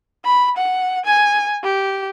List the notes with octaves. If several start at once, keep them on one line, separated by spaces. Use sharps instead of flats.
B5
F#5
G#5
G4